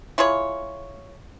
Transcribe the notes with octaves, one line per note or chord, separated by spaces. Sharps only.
E4 F4 G#4 C#5